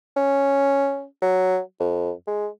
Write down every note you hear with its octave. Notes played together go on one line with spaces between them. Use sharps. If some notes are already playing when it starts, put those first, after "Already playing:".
C#4
F#3
F2
G#3